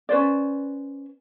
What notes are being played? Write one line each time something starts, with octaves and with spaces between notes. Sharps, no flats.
C#4 B4 C5 D5